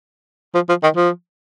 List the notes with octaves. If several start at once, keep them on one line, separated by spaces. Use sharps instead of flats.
F3
F3
D#3
F3